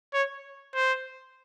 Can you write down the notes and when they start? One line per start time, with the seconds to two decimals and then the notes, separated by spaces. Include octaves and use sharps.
0.14 C#5
0.75 C5